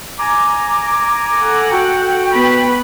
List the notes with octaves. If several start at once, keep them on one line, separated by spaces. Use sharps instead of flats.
G#5 A#5 D6
A4 F#5
F#4 G5
B3 B4 B5